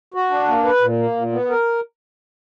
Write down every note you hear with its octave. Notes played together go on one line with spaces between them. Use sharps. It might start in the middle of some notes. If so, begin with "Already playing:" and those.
F#4
D4
A#3
B4
A#2
A#3
A#2
B3
A#4